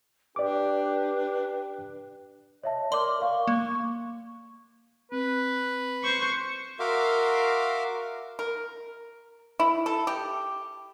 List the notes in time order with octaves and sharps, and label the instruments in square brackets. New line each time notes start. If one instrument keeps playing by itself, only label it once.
[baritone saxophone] D4 [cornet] G4 [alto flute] B4 [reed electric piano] D5 D6
[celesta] C#5 E5 A5 [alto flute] D#5
[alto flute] A#4 [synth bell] D5 G7 [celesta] C6 D6
[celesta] F5 [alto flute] C#6
[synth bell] A#3 [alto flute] C#6
[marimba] C4 [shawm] B4
[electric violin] C5 C#6
[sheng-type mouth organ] F#4 A#4 E5 F5 C6 D6
[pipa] A#4
E4
A4
G4